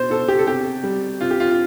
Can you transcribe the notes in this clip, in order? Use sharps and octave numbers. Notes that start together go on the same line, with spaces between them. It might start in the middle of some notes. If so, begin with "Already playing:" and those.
Already playing: B2 C5
B2 A4
G4
A4
C3 G4
G3
C3 F4
G4
F4
F4